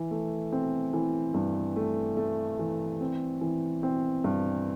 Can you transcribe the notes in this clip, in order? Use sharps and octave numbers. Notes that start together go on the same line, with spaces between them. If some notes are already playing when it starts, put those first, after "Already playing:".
Already playing: E3
A3
C4
E3
G2
A3
A3
E3
C4
E3
C4
G2